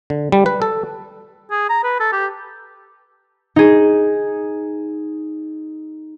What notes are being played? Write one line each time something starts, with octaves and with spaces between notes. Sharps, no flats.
D3
G3
B4
A4
G#4
A#5
B4
A4
G4
D#4 G#4